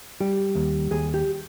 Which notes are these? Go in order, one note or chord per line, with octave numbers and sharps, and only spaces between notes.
G3 G4
D#2
D#2 G#4
G4